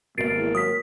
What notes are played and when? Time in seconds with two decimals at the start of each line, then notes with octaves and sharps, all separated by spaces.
0.18 G#1 B2 D3 A#3 A#4 A6 C7 D7
0.38 E2
0.55 F#3 D#6 B6